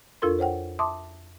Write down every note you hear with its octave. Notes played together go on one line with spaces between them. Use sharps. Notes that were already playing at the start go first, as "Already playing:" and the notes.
F2 D4 F4 A4 A#4 C6
C5 C#5 F#5 G5
E5 A5 C6 D6 D#6